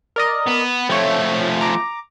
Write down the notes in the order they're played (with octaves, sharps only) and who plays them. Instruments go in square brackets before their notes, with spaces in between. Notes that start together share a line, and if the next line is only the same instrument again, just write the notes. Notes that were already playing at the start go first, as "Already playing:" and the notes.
[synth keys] A#4 D5 D#5
[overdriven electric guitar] B3
[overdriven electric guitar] F3 A3 [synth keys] C4 C#5
[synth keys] A#5 D6